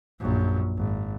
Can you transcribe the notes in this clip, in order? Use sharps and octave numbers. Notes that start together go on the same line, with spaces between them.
A#1 F#2
G#1